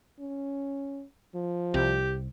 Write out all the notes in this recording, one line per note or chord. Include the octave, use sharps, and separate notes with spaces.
C#4
F3
C2 G4